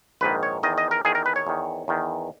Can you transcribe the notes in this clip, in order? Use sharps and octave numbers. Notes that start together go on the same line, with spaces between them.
A#1 G#2 D#3 B4
C#5
E2 D#3 D#5
D#5
A#4
E2 D#3 G#4
A#4
B4
C#5
E2 D#3
E2 D#3